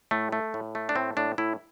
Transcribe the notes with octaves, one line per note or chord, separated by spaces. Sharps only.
A2 A3
A3
A2
A3
D4
A2 C4
A2 D4
A2 E4